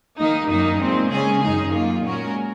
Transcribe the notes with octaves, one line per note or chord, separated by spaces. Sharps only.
D#3 A#3 D#4
F#2 D#3 A#3 D#4
A#2 G#3 C4
C#3 G#3 C#4 G#4
F#2 D#3 G#3 D#4 G#4
D#3 F#3 A#3 F4
A#2 G#3 C#4 F#4 A#4